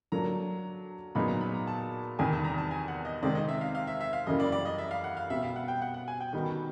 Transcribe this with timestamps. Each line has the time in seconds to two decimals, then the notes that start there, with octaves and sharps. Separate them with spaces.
0.12 F#3 A#3 D4 A#5
1.15 A#2 F#3 B3 D#4 G#4 B5
1.28 A#5
1.41 B5
1.54 A#5
1.67 A5
2.19 E2 C3 D#3 G3 G#5
2.33 A5
2.45 A#5
2.58 A5
2.71 G#5
2.88 F#5
3.05 D#5
3.23 C3 D#3 G#3 C4 D5
3.35 D#5
3.49 E5
3.61 F5
3.75 F5
3.87 E5
4.01 E5
4.13 F5
4.26 F#2 C#3 E3 G3 A#3 D#5
4.40 D5
4.52 D5
4.65 D#5
4.78 E5
4.91 F5
5.04 F#5
5.17 F5
5.30 B2 G3 C4 E5
5.43 F5
5.56 F#5
5.68 G5
5.82 F#5
5.94 F#5
6.08 G#5
6.20 G5
6.33 D#3 G3 B3 D#4 F#4